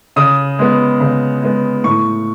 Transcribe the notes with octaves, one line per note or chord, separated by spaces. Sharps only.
C#3 D#6
G#3 B3
C#3
G#3 B3
A2 C#6